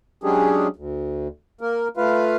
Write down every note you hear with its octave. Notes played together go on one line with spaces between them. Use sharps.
F#3 G#3 C#4 D4 G4 G#4
D2
A#3 A#4
A3 F4 B4 F5